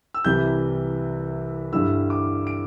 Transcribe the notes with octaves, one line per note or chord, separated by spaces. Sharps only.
E6
C2 C3 E3 G3 E4 G6
G2 D3 G3 E4 E6
D6
D7